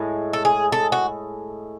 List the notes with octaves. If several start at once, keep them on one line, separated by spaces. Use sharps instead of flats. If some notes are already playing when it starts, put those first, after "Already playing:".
Already playing: A2 G#3
A4
G#4
A4
F#4